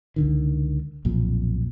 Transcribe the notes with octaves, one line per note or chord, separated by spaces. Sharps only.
C#2 D3 D#3
B1 F2 A#2